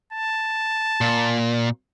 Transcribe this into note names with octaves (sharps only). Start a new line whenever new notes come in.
A5
A#2